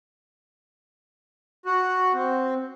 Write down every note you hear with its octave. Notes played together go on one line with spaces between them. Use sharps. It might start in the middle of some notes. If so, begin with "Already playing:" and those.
F#4
C4